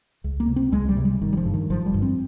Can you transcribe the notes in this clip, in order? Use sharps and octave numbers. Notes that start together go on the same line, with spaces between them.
C#2
A#3
C3
C4
C#2 G#3
G3
C3
G3
G1 D#3
G3
F3
G2
D#3
G1 F3
G3
G2
C4